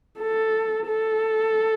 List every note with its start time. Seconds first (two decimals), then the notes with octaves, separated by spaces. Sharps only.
0.19 A4
0.87 A4